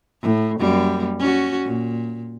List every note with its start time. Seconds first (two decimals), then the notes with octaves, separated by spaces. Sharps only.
0.22 A2
0.59 F#2 G3 A#3
1.19 C#4 F#4
1.64 A#2